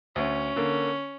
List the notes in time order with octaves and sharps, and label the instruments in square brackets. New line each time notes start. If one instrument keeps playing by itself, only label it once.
[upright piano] D2 [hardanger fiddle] C#4
[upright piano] D3 A#3